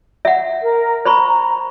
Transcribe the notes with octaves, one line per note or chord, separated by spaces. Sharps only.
E5 F#5
A#4
C5 A#5 B5 C#6